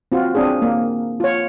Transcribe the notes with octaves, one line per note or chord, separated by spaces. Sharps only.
C4 F4 F#4
C4 D4 G#4
A#3
F4 C#5